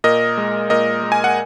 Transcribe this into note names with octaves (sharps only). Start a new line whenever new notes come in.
A#2 A#4 D#5
G#3
A#2 A#4 D#5
G#3
G#5
F#5